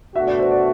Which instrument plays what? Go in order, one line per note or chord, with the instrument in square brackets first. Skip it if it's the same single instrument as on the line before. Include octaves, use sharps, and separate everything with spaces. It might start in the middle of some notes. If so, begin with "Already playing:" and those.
[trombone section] B2 A3 D4 F#4 [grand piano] E5
[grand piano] D5
C5
D5